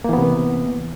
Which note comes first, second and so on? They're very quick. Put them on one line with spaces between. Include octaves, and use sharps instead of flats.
A#3 E3 B3 C3